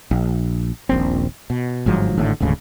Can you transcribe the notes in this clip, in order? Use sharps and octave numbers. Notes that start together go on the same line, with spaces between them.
A#1
D#1 A#1 C4
B2
G1 G#2 F3 F#3
G#1 A2 D3
D#1 D2 G#2 C#3